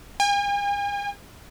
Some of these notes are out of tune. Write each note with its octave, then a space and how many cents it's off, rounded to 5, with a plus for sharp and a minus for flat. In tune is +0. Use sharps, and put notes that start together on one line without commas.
G#5 -45